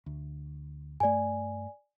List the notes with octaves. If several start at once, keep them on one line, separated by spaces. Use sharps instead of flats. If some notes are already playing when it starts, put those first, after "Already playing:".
D2
G2 A3 D5 G#5